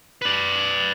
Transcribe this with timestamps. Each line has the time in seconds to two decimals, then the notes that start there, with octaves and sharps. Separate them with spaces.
0.22 B4 D5